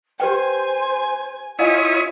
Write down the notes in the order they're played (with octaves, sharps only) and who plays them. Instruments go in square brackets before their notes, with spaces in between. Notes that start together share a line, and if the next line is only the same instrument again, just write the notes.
[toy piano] G4 B4 G5 [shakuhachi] C5 [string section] G#5
[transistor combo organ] E4 C#5 D#6 [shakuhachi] F4 [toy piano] D#5 F5 G#5